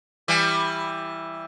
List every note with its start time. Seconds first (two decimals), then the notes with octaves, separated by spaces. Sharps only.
0.28 E3 G3